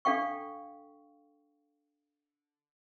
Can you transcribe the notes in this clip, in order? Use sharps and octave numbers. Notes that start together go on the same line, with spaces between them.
D4 A4 F5 G5 C#6